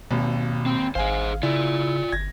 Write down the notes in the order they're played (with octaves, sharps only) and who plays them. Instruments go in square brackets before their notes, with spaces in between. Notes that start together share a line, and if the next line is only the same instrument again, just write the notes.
[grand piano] G#1 D#2 [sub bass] B2
[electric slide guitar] C4
[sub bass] G#1 [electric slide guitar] G#4 C5 [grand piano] F5 G#5
[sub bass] C#3 [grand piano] E4 [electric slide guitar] F4 D5
[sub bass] G1 [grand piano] G#6 A#6